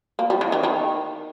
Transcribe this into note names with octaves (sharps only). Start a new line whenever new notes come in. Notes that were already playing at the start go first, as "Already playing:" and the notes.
A#3
G3
E3
D#3
D#3